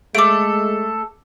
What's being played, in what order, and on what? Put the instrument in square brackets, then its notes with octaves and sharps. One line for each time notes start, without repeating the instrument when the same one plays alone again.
[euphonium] G#3 [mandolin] A3 A4 [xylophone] D6 D7